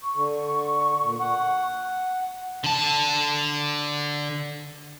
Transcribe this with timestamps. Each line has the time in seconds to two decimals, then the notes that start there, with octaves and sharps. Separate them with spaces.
0.01 C#6
0.16 D3
1.01 A#2
1.20 F#5
2.64 D3 A5